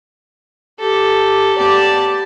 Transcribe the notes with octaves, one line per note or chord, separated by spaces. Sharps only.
G4 A4
B3 G4 D5 A5